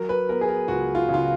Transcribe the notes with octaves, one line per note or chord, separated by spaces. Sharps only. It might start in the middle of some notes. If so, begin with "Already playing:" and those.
Already playing: F#3 A#4
B4
B3 A#4
G#4
A#4
C#2 F#4
F4
C#3
F4